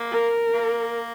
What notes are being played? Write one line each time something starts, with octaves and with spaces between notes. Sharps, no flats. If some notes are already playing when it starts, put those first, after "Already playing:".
Already playing: A#3
A#4
A#3